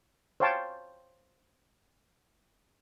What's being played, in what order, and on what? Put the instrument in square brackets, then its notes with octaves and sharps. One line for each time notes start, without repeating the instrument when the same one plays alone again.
[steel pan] C5 C#5 F5 G5 A5